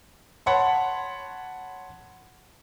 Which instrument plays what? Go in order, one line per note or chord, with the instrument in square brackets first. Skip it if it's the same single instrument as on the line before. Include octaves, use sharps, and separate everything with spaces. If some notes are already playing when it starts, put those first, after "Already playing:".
[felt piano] C#5 F#5 A5 B5 C6